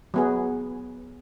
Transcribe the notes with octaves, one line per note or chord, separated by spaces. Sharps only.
F#3 B3 G#4